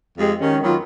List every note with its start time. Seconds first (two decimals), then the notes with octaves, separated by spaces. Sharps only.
0.18 F2 G#3 G4
0.40 D#3 C#4
0.63 D#3 F#3 B3 F4